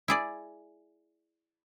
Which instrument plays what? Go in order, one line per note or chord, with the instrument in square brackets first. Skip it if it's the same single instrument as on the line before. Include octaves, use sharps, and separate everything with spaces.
[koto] E4 G#4 D5